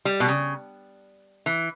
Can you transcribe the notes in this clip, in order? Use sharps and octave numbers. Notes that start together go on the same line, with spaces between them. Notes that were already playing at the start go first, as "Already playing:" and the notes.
G3
B2
C#3
E3